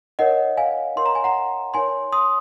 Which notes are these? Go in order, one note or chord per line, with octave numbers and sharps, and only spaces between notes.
D#4 A#4 C#5 D#5 F#5
F5 G#5
D#4 A#4 C#5 C6
A#5
G#5
F#5 A#5
D#4 A#4 C#5 G#5 C6
C6 D#6